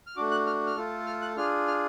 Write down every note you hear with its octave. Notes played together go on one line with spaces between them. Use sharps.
F6
A3 D4 F#4 D6
F#6
F6
F6
A3 F4 A4
F6
F#6
D4 F4 G#4 F6
F6